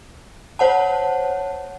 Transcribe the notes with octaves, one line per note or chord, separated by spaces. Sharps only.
C5 C#5 F#5 A5